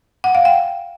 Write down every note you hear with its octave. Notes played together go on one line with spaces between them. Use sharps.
F#5
F5
G5